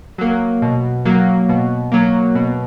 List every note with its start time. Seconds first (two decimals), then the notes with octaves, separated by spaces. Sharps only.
0.18 F#3 A#3
0.62 B2
1.05 F#3 A#3
1.49 B2
1.92 F#3 A#3
2.35 B2